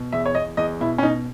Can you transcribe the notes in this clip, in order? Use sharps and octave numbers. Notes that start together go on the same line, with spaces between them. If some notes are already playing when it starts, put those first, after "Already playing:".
Already playing: B2
E2 E5
C#5
E2 D#5
E2 D#5
B2 E4
C#4
B2 D#4